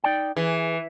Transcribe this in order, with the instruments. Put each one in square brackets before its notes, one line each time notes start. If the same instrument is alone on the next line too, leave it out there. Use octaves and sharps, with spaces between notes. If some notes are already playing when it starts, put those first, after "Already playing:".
[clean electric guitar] D#4 D5 G5
[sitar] E3 [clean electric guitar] G#4